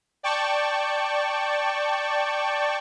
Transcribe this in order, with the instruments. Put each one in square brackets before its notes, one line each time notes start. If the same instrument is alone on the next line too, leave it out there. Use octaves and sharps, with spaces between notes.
[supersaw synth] D5 G5 A5 C#6